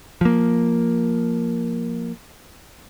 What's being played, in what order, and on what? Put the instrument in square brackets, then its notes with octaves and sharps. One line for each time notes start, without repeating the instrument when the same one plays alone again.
[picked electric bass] F3 A#3